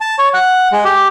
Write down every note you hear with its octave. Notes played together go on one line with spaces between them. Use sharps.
A5
C#5
F#5
G#3
G4